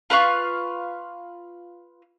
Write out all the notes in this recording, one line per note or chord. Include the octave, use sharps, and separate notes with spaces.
F4 B4 F5 C#6